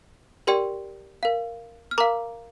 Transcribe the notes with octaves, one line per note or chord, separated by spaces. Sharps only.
G4 A#4 D5 G5 C6
A#4 F5
F6
A#4 F5 A#5 D6